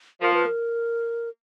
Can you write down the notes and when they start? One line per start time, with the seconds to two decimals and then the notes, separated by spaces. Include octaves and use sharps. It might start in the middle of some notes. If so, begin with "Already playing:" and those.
0.21 F3 A#4
0.34 B4
0.46 A#4